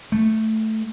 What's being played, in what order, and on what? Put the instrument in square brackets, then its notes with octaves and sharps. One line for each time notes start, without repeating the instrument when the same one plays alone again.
[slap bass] A3